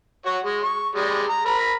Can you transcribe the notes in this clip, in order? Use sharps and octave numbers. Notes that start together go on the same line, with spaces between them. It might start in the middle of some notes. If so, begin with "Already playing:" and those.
F#4 C#5 F#5
G#3
C#6
G3 G#3
A#5
A#4 B5